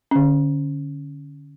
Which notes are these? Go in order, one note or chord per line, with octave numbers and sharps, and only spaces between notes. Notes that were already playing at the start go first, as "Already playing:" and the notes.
D3 C#4